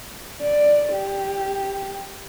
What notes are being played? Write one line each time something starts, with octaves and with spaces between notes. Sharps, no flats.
D5
G4